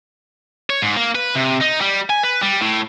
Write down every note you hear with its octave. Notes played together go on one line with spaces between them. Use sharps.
C#5
G#2
A#3
B4
C3
D#4
G3
G#5
B4
G3
A2